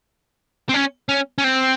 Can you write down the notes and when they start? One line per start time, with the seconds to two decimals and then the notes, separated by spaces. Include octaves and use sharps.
0.69 C4
0.74 C#4
1.09 C#4
1.38 C#4
1.44 C4